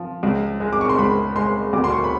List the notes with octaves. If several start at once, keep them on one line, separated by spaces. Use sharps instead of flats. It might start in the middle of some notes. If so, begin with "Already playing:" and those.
Already playing: F3
C#2
G#3
D6
C#6
C6
C#2 B5
G#3 C6
D2 D6
C6
C#6
B5